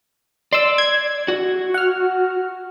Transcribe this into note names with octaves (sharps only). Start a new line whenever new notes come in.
D5 C6 E6
G#6
F#4
F#5 F6